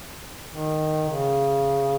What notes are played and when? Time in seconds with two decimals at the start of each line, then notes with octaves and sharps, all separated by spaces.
0.50 D#3
1.09 C#3